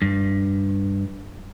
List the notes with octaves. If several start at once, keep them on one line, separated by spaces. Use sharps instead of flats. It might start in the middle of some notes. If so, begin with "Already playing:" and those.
G2